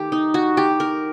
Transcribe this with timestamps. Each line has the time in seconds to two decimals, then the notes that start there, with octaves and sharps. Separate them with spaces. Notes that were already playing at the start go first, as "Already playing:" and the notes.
Already playing: D#3 A3 G4
0.12 D#4
0.34 F#4
0.57 G4
0.80 A#4